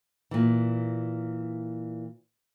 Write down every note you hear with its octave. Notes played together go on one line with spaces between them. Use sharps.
A#2 E3